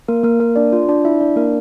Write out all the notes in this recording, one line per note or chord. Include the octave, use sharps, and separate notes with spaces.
A#3 A#4
A#3 A#4
A#3 A#4
D4 D5
F4
D4 D5
E4 E5
D4 D5
A#3 A#4